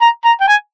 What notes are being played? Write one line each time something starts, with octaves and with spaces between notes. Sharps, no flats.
A#5
A#5
G5
G#5